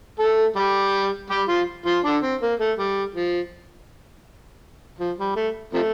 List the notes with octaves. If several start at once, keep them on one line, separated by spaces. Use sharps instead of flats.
A3 A4
G3 G4
G3 G4
F3 F4
F3 F4
D3 D4
C4
A#3
A3
G3
F3
F3
G3
A3
C3 F3 A3